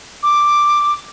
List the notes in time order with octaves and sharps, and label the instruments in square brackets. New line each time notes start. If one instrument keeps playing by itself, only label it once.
[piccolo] D6